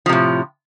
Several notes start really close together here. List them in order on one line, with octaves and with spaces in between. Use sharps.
F3 C3 A2